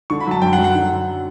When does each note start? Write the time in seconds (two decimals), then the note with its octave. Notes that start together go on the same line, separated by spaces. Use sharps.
0.10 D3 C#6
0.20 B5
0.27 F#3 A5
0.42 F#2 G5
0.53 F#5
0.58 F#2
0.64 F#5
0.75 D3
0.91 F#3